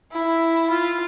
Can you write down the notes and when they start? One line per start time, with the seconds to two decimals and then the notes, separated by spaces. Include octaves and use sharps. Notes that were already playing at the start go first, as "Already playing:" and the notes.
0.12 E4
0.70 F4